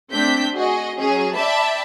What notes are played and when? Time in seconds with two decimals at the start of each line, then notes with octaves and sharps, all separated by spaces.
0.12 A3 C4 D4 G6 B6
0.55 F#4 G#4 D#5
0.98 F#3 C#4 G#4
1.34 D5 E5 G5 A5 B5